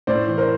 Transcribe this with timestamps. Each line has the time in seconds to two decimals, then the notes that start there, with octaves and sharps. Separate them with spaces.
0.07 A2 C5 D5
0.27 E3
0.37 A#4 C5